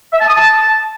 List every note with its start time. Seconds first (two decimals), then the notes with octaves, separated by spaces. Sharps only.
0.13 E5
0.20 A5
0.28 D#6
0.36 A5